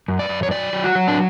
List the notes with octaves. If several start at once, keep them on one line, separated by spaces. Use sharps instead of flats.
F#2
D5
F#2
C#5
F#3 D5
F#3
F#4
F#3
D4